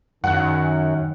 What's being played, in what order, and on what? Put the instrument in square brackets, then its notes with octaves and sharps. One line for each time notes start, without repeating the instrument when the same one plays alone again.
[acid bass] F#2 [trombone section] D#3 [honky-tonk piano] F#5 F#6